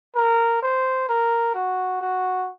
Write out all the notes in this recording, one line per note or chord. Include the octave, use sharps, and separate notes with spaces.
A#4
C5
A#4
F#4
F#4